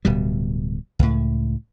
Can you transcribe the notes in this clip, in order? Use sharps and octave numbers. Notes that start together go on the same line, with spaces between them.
D1 B2 G3
C#2 A2